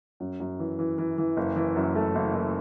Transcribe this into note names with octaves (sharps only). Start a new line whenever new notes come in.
F#2
F#2
E3
E3
E3
E3
F#1
E3
F#2
A3
F#1
F#1